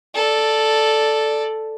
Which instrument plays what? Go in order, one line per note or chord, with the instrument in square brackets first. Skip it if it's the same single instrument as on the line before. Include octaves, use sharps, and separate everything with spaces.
[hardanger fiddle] A4 D5